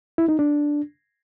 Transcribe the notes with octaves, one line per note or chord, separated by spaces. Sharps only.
E4
D#4
D4